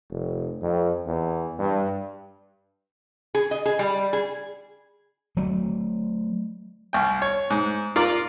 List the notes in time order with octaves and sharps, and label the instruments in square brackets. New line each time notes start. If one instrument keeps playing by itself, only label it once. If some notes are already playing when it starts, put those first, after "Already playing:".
[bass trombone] F1
F2
E2
G2
[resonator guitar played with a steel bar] G#4
D#5
G#4
G3
G#4
[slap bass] F#3 A3 C4
[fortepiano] C2 G5
C#5
G#2
F4 A#4 D5 D6